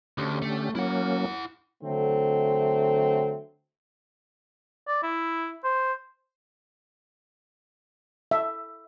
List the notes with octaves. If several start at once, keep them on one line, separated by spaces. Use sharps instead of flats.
D2 D3 C#4 G4
A3
F#3 A#3 C#4 E4 F#5
D3 F#3 A3 C4
D5
E4
C5
E5